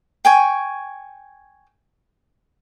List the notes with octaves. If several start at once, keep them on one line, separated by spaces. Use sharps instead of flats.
G5 G#5 C#6